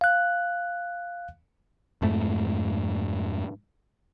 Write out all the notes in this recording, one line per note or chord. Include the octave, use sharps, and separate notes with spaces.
F5 F#6
F2 G#2 A3